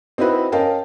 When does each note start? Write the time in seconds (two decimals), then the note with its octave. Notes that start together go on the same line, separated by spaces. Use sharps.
0.18 C4 D#4 E4 F#4 B4
0.52 C#4 A#4 D#5 F5 G5 A5